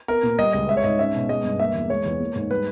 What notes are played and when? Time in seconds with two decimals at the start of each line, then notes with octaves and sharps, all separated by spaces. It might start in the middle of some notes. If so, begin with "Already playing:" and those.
0.08 B3 A#4
0.23 A#2
0.39 G3 D#5
0.53 C#2 D#5
0.69 G#3 E5
0.77 C#5
0.84 G#2 D#5
0.99 C#4 E5
1.14 B2
1.29 G#3 D#5
1.45 G2
1.59 A#3 E5
1.75 E2
1.90 G#3 C#5
2.06 E2
2.20 A#3
2.36 G#2
2.50 G3 B4